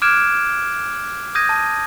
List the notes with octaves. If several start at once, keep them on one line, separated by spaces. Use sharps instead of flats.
D6 F6 F#6 G#6 D7 E7
D#6 G6 G#6 A#6 D#7
A5